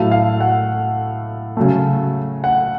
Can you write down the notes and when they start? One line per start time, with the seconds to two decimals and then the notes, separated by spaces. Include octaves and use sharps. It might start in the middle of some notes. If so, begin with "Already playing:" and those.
Already playing: A2 F#3 A3 F5
0.11 F5
0.40 F#5
1.57 C#3 F#3 A3
2.44 F#5